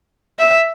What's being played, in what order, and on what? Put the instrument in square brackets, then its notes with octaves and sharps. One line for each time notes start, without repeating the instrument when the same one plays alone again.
[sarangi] E5